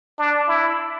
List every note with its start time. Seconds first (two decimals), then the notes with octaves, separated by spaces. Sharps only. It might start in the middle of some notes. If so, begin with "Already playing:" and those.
0.19 D4
0.48 E4